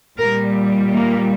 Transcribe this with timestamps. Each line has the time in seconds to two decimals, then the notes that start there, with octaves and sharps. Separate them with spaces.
0.17 A#2 G3 A#4
0.91 A#3